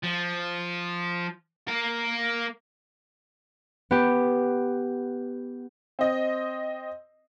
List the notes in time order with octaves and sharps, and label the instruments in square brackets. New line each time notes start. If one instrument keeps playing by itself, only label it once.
[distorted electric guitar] F3
A#3 A#4
[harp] B3 G4
[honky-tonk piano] C4 D#5